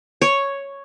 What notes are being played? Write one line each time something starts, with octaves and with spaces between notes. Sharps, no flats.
C#5